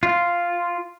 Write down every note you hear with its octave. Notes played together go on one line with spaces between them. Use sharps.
F4